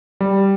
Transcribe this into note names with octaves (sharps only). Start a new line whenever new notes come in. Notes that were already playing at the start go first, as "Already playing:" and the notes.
G3